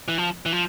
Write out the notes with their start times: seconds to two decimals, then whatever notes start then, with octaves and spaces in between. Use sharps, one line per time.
0.08 E3
0.18 F3
0.46 E3
0.53 F3